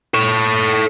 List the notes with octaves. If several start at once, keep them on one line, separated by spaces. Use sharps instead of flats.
A4 C#5